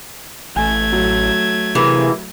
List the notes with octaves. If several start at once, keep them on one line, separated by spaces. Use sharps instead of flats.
A1 A3 G#5 G#6
F#3
C3 E3 A#3 G#4